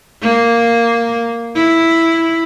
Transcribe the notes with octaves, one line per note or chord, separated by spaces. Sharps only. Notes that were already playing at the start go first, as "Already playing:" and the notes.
A#3
E4